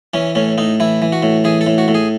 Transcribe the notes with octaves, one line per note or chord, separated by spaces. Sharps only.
E3 C#4
A2 C#4
A2 D#4
E3 E4
E3
F#4
A2
E3 G#4
A4
A2
F#4
A2
G#4